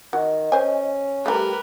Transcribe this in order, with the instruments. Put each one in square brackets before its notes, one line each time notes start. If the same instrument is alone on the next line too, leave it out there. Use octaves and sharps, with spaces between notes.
[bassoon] D#3 [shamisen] F#4 [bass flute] D#5
[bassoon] C#4 [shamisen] C5 G#5
[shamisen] G3 A3 [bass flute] G4 [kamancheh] A#4 B4